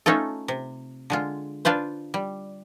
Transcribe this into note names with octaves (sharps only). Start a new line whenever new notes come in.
A3 C#4 D#4 F4 A4
C3
D3 G#3 F4
D4 F4 B4 C5
G3